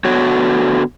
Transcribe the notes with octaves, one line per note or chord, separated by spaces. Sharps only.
D3 B3 F#4 C#5